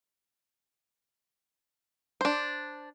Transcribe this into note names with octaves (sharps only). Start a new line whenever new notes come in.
D4 C5